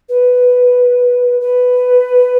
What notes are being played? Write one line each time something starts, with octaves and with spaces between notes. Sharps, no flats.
B4
B4